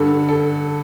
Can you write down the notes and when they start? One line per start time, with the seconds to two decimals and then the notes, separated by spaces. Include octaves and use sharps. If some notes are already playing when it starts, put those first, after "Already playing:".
Already playing: G2 D3 A4
0.29 A4